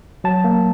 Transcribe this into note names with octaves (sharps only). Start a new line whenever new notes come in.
F#3 A5
A#3